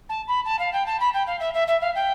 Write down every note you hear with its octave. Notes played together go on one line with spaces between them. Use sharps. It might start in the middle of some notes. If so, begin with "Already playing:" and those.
A5
B5
A5
F5
G5
A5
B5
G5
F5
E5
E5
E5
F5
G5